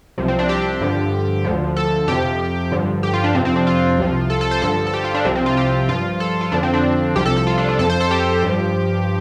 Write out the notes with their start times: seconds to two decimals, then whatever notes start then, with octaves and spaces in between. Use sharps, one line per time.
0.18 C2 C3 F3
0.28 C4
0.39 D4
0.49 G4
0.81 G2 D3 F3
1.44 D2 D3 F3
1.76 A4
2.08 F2 C3 F3 G4
2.72 G2 D3 F3
3.03 G4
3.13 F4
3.24 D4
3.35 F2 C3 F3 C4
3.45 C4
3.56 D4
3.67 F4
3.98 C2 C3 F3
4.30 A4
4.41 A4
4.51 C5
4.62 G2 D3 F3 A4
4.87 A4
4.94 G4
5.04 F4
5.14 D4
5.25 C2 C3 F3 C4
5.35 C4
5.46 F4
5.57 G4
5.88 G2 F3 F4
6.20 A4
6.41 F4
6.52 F2 D3 F3 D4
6.63 C4
6.74 D4
7.15 C2 C3 F3 G4
7.25 A4
7.37 A4
7.47 F4
7.58 D4
7.69 D4
7.79 F2 F3 A4
7.90 C5
8.00 A4
8.11 G4
8.43 G2 F3